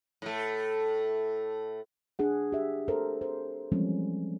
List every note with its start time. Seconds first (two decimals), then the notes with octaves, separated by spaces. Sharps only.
0.22 A2 A3
2.19 D4 G#4 F#5
2.52 G4 E5
2.88 A4 A#4 C5
3.21 C5
3.72 E3 F3 G3 G#3 C4 C#4